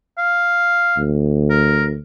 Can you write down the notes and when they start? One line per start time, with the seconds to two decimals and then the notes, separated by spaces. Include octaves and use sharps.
0.18 F5
0.97 D2
1.50 A#4